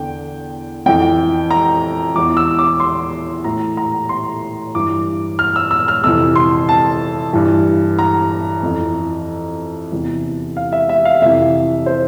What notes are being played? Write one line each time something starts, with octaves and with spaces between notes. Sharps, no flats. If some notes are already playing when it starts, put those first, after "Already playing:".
Already playing: E2 D3 G5
F2 E3 G5
A#5
E2 E3 D6
E6
D6
C6
A2 E3 A#5
A#5
C6
G2 E3 D6
F6
E6
E6
F6
F2 C3 E3 E6
C6
A5
G2 E3
A#5
F2 E3
E2 C3 E3
F5
E5
E5
F5
F2 C3 E3 E5
C5